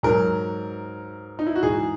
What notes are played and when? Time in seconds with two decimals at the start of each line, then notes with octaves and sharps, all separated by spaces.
0.03 G#2 F#3 A#4
1.39 D#4
1.46 E4
1.56 F#4
1.63 G#2 E3 G#4